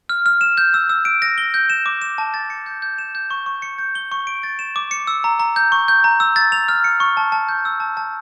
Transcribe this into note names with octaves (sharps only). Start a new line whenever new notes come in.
F6
F6
E7
G6
E6
E6
D7
A#6
G7
G6
E7
D6
E7
A5
A6
C#7
G6
G6
E7
G6
C#6
C#6
C#7
G6
G7
C#6
D7
A6
E7
D6
C#7
E6
A#5
A#5
G6
C#6
G6
A#5
E6
A6
F7
F6
C#7
C#6
A5
A5
G6
E6
A5
A5